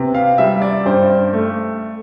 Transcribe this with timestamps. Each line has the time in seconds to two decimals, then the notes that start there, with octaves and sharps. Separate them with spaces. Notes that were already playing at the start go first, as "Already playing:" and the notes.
Already playing: C3 B3
0.15 F5
0.38 G3 E5
0.62 D5
0.86 G2 C5
1.33 A3